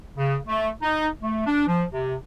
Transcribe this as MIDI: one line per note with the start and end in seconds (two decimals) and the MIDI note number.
0.17 0.37 49
0.47 0.69 57
0.82 1.08 63
1.22 1.45 57
1.46 1.64 62
1.67 1.84 53
1.93 2.15 48